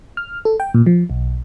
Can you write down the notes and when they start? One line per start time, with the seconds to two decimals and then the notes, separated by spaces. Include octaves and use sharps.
0.17 F6
0.45 A4
0.60 G5
0.74 A#2
0.86 F3
1.10 B1